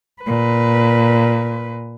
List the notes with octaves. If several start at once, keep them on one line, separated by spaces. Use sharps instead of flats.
A#2 B4